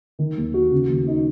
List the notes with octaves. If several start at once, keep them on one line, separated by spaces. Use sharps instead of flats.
D#3
D#2
F#4
C#3
D#2
D#4